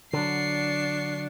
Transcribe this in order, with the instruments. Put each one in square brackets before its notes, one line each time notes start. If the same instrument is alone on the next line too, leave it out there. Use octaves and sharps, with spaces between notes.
[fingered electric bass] D3 F#3 [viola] D4 [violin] C#6 C7